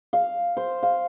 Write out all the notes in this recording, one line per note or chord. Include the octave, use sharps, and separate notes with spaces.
F5
C5
F5